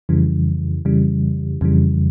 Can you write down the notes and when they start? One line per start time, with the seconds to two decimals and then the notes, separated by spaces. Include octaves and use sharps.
0.09 F2 C#3 E3 G3
0.85 F2 C#3 E3 G3
1.61 F2 C#3 E3 G3